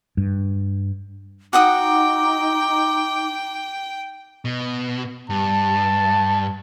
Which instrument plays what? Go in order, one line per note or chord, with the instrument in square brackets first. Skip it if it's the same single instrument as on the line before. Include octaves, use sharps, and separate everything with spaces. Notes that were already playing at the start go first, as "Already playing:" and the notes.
[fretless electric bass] G2
[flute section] D#4 [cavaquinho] F#4 F#5 D#6 [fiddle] G5 [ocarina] D6
[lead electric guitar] B2
[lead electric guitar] G2 [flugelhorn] A5